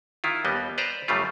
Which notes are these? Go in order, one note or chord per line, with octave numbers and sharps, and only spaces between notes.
D#3 E4 F4
D#2 G3 B3 D#5
B4 C5 D5 A#5
F#2 C#3 G3 A3 F4